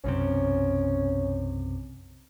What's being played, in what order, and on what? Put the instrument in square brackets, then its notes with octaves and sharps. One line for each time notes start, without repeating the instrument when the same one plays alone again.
[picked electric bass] B1 F#2 C3 [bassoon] C#4